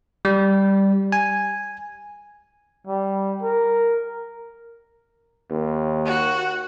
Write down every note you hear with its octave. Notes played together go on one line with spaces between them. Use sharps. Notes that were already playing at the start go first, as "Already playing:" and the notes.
G3
G#5
G3
A#4
D#2
F#4